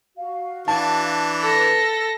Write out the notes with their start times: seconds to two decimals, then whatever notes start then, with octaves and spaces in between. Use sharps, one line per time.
0.17 F#4 F5
0.68 E3 D4 A5
1.42 A4 B4 A#6